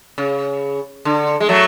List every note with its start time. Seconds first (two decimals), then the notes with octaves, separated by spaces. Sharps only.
0.18 C#3
1.05 D3
1.40 G#3
1.49 F#3 A3